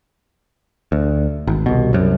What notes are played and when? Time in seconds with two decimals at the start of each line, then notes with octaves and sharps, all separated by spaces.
0.92 D2
1.47 G#1
1.66 C2 B2
1.93 C2 F#2